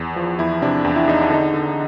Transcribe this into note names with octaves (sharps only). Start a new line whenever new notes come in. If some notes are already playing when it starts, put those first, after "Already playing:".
Already playing: E2
F3
E2 E4
C3 D4
E2
E4
E2 D#4
D4
D3 D#4
D3